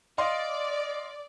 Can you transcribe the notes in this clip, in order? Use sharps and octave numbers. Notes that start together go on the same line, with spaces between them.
D5 D#5 F5 C6